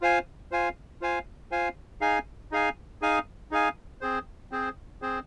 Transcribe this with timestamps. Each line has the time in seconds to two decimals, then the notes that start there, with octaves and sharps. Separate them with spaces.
0.01 F4 C5 F5 G#5
0.51 F4 C5 F5 G#5
1.01 F4 C5 F5 G#5
1.51 F4 C5 F5 G#5
2.01 D#4 G#4 F5 G#5
2.52 D#4 G#4 F5 G#5
3.02 D#4 G#4 F5 G#5
3.51 D#4 G#4 F5 G#5
4.01 C4 G#4 C5
4.52 C4 G#4 C5
5.02 C4 G#4 C5